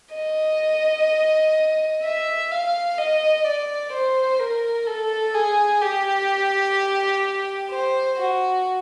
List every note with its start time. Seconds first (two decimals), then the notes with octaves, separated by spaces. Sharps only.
0.15 D#5
2.03 E5
2.51 F5
2.98 D#5
3.45 D5
3.92 C5
4.40 A#4
4.87 A4
5.34 G#4
5.81 G4
7.70 C5
8.18 F#4